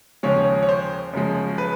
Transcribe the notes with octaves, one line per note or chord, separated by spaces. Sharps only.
D#2 C#3 F3 G#3 C#4 C#5
C#5
C5
F#2 C#3 F3 G#3
B4